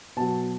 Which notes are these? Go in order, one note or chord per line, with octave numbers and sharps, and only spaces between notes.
B2 F#3 A5